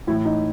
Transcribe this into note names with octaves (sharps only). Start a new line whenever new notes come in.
A2 E3 E4
D#4